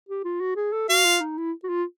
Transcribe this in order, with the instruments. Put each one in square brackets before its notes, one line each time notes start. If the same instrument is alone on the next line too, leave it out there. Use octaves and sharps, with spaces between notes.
[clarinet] G4
F4
F#4
G#4
A4
[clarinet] F#4 [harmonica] F5
[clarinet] F4
D#4
E4
F#4
F4